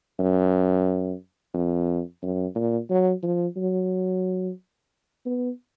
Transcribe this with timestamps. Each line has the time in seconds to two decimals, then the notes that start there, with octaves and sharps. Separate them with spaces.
0.19 F#2
1.54 F2
2.23 F#2
2.55 A#2
2.90 F#3
3.23 F3
3.57 F#3
5.26 B3